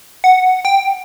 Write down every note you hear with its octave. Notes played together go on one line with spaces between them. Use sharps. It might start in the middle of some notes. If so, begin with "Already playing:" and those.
F#5
G5